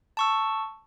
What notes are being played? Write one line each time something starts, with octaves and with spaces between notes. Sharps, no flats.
A5 C#6 E6